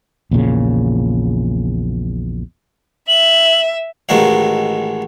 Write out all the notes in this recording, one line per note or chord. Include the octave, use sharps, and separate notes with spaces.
A#1 E2 A#2 C#3
E5 F#7
A1 D#3 G#3 F#4 F5